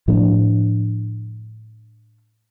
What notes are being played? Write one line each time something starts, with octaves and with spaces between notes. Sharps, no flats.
A2 F3 A3 D4